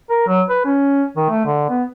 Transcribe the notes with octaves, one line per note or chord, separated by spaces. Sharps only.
A#4
F#3
B4
C#4
D#3
A3
D3
B3